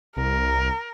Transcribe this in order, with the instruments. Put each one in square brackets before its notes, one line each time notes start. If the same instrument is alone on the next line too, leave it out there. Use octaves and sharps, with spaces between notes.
[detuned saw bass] C2 [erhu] A#4